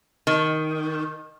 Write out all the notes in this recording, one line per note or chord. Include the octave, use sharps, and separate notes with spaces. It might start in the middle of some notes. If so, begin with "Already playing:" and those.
D#3